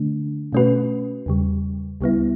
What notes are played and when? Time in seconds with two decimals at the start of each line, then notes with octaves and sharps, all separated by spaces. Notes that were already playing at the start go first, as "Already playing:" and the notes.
Already playing: D3 A3 D4
0.53 B2 A3 C#4 F#4 B4
1.26 E2 C#3 G3
2.01 C#2 C#3 G3 B3 E4